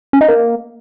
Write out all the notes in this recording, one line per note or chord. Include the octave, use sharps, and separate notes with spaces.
C#4
D#4
A#3